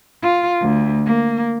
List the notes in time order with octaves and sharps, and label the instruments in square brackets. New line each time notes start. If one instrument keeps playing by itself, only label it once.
[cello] F4
D2
A#3